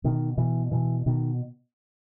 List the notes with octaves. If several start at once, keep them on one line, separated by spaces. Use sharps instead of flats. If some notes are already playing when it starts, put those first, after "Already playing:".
B2 D#3
B2 E3
B2 E3
B2 D#3